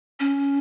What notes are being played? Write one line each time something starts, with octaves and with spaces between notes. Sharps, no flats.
C#4